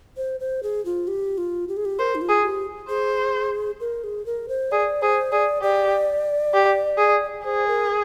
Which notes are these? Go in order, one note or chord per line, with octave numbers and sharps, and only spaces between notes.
C5
C5
G#4
F4
G4
F4
G4
G#4
G4
A#4 C5
D#4
F4
G#4
G4
G#4 C5
A#4
G#4
A#4
C5
G#4 D5
G#4 C5
G#4 D5
G4 D5
G4
G#4
G#4 C5
A#4